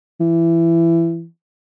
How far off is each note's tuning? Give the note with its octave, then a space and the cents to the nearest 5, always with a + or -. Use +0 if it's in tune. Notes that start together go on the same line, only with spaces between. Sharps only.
E3 +20